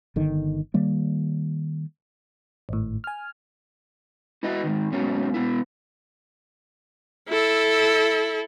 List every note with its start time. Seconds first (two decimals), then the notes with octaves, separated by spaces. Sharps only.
0.16 G1 D3 D#3
0.74 D#3 G3 A#3
2.69 G#1 A2
3.04 G#5 F6
4.43 E4 F#4 B4 D#5
4.64 G#2 D#3
4.92 G#2 B2 F#3 A#3 C#4
5.34 B2 B3 E4
7.29 E4 A4